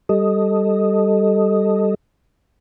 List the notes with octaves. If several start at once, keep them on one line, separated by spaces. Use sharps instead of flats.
G3 A4 D#5